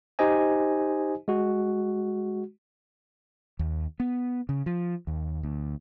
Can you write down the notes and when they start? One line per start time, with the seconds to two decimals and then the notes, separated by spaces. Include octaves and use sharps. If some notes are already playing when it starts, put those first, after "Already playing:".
0.19 D#4 G4 C5 D#5 G#5
1.28 G#3 F#4
3.59 D#2
4.00 B3
4.49 C#3
4.66 F3
5.07 D#2
5.43 D2